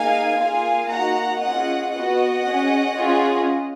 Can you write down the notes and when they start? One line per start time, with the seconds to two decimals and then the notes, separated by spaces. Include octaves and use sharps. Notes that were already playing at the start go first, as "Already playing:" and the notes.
Already playing: A#3 D#4 G#4 F5 G#5
0.37 A#3 F4 G#4 F5 G#5
0.89 A#3 D#4 F#4 F#5 A#5
1.40 C#4 F4 G#4 D#5 F#5
1.93 B3 F#4 D#5 F#5
2.44 C#4 G#4
2.96 C#4 F4 G#4